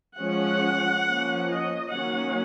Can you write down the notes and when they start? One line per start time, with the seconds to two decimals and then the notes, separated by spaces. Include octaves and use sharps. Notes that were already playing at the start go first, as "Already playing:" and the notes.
0.18 F3 G#3 C#4 F#5
1.06 F3 A#3 C#4
1.50 D#5
1.92 D#3 F#3 A#3 C#4 F#5